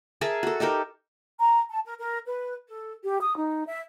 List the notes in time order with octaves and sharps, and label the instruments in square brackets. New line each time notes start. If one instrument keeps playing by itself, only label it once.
[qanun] G#4 A#4 E5 A5
F#4 A4
D#4 G4 A4 A#4
[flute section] A#5
A5
A#4
A#4
B4
A4
G4
D#6
D#4
E5